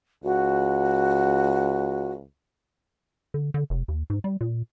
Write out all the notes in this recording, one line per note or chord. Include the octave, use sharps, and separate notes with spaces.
C#2 F#4
D3
D3
F1
D#2
G#2
G3
A#2